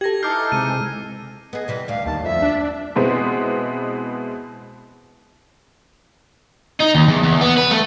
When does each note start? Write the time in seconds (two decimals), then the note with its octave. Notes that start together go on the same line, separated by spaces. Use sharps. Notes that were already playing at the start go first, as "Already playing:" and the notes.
0.01 G4 A4 G#6 A#6
0.23 E3 D#4 A4 D6 F6 G6 C7
0.52 C3 G#3 D#7
1.53 B3 G#4 D#5
1.68 C3 E3 G3
1.88 D2 G3 F5
2.06 D#2 A5
2.24 F2 E5
2.42 D4
2.96 B2 E3 G#3 B3 C4
6.80 D#4
6.95 D#2
7.08 E2
7.23 E2
7.41 B3
7.57 B4
7.71 A3